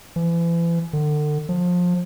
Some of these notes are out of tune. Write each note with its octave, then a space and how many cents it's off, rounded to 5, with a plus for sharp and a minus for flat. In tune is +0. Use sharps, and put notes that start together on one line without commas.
E3 +40
D3 +35
F3 +25